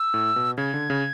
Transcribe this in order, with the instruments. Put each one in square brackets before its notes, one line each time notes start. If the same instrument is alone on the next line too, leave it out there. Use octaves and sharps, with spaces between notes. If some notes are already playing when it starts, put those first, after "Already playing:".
Already playing: [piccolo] E6
[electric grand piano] A2
B2
[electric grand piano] C#3 [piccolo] G#6
[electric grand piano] D3
C#3